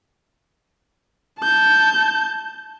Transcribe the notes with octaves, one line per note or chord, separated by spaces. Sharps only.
A5 G6